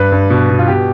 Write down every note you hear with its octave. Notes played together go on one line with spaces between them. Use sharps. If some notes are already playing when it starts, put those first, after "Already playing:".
Already playing: G2 B4
G2
B2
B2
F4
B2 G4